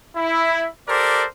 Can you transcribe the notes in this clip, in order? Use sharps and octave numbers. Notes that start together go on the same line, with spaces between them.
E4
G4 A4 A#4 C5 D5